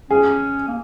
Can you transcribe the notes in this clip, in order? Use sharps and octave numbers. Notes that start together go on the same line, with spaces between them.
C#4 G#4
A#3